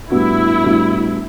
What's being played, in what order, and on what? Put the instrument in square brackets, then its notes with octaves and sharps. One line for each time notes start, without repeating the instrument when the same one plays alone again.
[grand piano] A2 G3 B3 D4 F#4 [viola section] E4
[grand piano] A2 G3 B3 D4 F#4